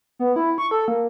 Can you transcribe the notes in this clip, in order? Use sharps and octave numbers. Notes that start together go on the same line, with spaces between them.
B3
E4
C#6
A4
A#3